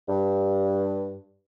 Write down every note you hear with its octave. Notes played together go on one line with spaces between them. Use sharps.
G2